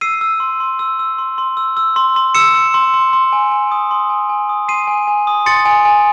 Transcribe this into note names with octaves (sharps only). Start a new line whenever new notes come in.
E6 C7 D#7
E6
C6
C6
E6
E6
C6
C6
E6
E6
C6
C6
E6 C#7 E7
E6
C6
C6
C6
G#5
G#5
D#6
C6
G#5
G#5
D#6
C6 C7 D#7
G#5
G#5
D#6
C6 A6 C#7
G#5
G#5